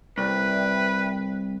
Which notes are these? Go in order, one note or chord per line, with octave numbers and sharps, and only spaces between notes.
C2 B4 D5 E5 G5